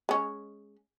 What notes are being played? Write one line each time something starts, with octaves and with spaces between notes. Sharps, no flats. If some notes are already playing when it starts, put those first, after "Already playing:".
G#3 C#4